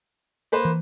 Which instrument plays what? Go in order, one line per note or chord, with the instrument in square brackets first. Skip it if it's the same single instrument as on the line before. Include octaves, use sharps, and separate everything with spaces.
[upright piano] A#3 B4 C5
[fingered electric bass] E3